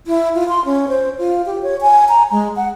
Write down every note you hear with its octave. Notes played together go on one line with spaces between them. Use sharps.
E4
F4
C6
C#4
C5
F4
G4
C#5
G#5
A#5
G#3
F#5